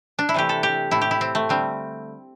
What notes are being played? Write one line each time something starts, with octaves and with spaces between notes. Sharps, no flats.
D4
E4
C3 E3 A3 G4
A4
G4
A2 A3 E4
G4
E4
C4
A3
D3 G3 C4